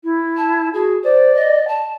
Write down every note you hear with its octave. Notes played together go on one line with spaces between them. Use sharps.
E4
A5
F#4 G#4
C5 D5
D#5
A5